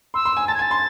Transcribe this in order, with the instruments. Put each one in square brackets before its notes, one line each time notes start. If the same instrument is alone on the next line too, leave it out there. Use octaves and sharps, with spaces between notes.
[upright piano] C6 [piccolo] E6
[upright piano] C6
G#5
[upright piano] A5 [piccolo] A6
[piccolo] G#6
[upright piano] G#5 [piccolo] A6
[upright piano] C6